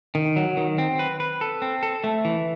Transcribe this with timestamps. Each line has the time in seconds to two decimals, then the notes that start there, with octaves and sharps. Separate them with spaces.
0.15 D#3
0.36 F#3
0.57 D#3
0.78 C4
0.99 B4
1.20 B4
1.41 A4
1.62 C4
1.83 A4
2.04 A3
2.25 E3